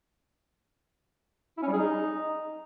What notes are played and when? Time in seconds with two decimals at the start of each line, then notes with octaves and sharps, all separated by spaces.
1.57 E4
1.62 C#4
1.67 G3
1.72 G#4
1.78 D#4